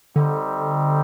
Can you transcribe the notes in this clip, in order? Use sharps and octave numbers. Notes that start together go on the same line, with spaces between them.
D3 G3 C4 D#4